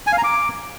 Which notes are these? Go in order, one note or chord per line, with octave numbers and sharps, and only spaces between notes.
G#5
F5
A#5
D6